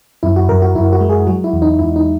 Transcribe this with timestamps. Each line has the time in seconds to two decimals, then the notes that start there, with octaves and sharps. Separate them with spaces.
0.23 F#2 E4
0.36 F#4
0.49 F#2 A#4
0.62 F#4
0.75 F#2 E4
0.93 F#4
1.01 G#3
1.09 G#4
1.27 F#3 F#4
1.44 E4
1.53 E2
1.62 D#4
1.79 E2 E4
1.96 D#4